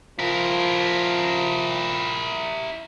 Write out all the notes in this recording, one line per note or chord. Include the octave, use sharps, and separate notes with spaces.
F3 E4 A#4